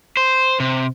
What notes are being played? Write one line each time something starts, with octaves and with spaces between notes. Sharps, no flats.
C5
C3